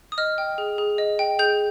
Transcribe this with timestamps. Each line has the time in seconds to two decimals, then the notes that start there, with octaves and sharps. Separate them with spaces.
0.12 D#6
0.18 D#5 F6
0.38 G5
0.58 G#4
0.78 G#4
0.98 D#5
1.19 G5
1.39 G#4 G6